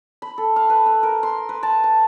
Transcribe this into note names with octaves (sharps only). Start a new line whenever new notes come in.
B5
A4
F5
B4
E6
A#4
C6
B4
A5
A5